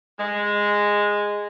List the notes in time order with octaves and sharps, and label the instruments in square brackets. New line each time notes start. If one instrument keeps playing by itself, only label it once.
[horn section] G#3